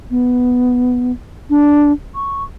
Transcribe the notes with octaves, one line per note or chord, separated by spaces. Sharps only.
B3
D4
C#6